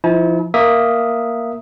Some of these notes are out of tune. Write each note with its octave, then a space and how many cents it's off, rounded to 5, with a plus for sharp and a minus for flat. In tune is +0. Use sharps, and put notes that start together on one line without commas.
F3 -25 E4 -45 A5 -35
A#3 +0 E5 +0 D#6 +0